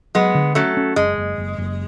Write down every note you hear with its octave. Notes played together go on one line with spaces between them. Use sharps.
F#3 G#3 B3
D3
F#3 A3 C#4
C#4
F#1 G#3
F#1
F#1
F#1